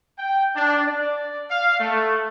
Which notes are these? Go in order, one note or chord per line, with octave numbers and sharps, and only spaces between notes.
G5
D4
D5
F5
A3